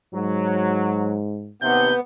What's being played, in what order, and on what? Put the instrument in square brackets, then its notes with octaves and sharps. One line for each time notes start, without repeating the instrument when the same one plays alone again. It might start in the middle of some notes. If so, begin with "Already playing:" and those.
[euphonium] G#2 [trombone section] F#3
[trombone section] D#2 C3 [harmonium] B3 [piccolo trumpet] G6